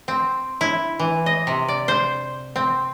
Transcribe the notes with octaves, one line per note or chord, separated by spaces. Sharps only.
C4
E4
E3
D#5
C3
D5
C5
C4